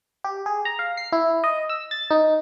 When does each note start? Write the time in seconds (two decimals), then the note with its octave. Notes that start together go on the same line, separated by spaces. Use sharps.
0.24 G4
0.46 G#4
0.65 A#5
0.79 F5
0.97 C7
1.12 E4
1.44 D#5
1.69 E6
1.91 A6
2.11 D#4